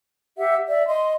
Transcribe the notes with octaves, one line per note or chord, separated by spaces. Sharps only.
G4 E5 F#5
D5 E5
D#5 C6